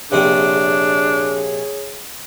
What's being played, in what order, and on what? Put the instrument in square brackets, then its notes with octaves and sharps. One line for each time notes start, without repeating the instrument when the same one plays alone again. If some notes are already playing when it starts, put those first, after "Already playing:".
[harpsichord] A#1 C3 C4 [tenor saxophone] D4 [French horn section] G#4 C#5